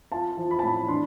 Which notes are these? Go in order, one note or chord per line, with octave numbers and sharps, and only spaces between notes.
F4 A5
F3
B5
A5
A2 B5
D4 C6